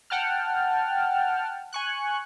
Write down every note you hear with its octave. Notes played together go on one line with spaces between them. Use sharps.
F#5 G5 A5 F6
G#5 C#6 F#6